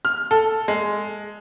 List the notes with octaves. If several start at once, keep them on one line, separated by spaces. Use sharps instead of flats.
F6
A4
G#3